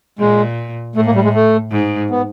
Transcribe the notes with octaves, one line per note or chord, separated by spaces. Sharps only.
A#2 G#3
A2 A3
A#3
G3
G#3
A3
G#2
B3